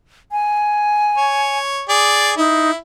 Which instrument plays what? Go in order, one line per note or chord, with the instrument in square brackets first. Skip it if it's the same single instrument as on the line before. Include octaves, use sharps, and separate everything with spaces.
[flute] G#5
[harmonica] C#5
G#4 D5
[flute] D#4 [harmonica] E4